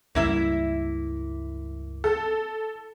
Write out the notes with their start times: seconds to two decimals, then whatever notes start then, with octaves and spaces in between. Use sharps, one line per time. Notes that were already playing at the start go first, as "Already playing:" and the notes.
0.15 C#2 G2 G3 A#3 E4 E5
2.04 A4